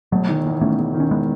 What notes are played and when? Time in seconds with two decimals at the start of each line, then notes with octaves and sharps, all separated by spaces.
0.12 E1 F#3 A3
0.29 D#3
0.45 E2
0.61 E1 A3 C#4
0.78 E1
0.94 D#3
1.00 C#4
1.11 G#3 B3